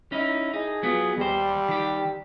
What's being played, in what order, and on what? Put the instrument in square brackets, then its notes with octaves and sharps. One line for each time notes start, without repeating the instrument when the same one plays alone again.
[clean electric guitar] C#4 D#4 [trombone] E4
[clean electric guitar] D#4 [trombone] G#4
[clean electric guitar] F#3 B3 F4
[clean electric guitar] D#2 C5 [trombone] G3
[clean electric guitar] D#3 G4